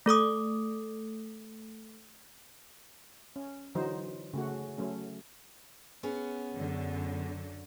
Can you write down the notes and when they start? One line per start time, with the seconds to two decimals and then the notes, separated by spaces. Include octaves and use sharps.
0.06 A3 A4 D6 D#6
3.36 C#4
3.75 D3 E3 F#3 D#4 C5
4.34 C#3 A3 F#4
4.78 F#3 A3 C#4
6.03 B3 C#4 G#4
6.56 F#2 D3